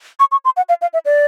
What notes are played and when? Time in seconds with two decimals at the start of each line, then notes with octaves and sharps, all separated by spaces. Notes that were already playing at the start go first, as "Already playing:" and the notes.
0.20 C#6
0.32 C#6
0.45 C6
0.57 F#5
0.69 F5
0.82 F5
0.93 E5
1.05 D5